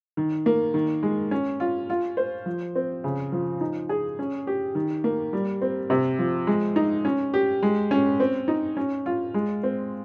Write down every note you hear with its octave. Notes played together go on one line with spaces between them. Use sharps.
D#3
A#3
D#3
G#3
C#4
F4
F4
C5
F3
C4
C#3
F3
D#4
G#4
C#4
G4
D#3
A#3
G3
C4
C3
F3
G#3
D#4
C#4
G4
G#3
C#4
C4
D#4
C#4
F4
G#3
C4